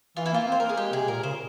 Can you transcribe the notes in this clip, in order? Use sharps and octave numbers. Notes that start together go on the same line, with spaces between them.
E3 F4
E4
A#3 F4
C4 C5
A#3 A#4
G#4
G#3 G4
C3 G#4
A#2 A#4
C#3 C5